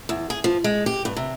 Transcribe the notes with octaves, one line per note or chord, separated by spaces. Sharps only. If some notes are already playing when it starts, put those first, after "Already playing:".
E2
G#4
F3
G#3
G4
G2
C3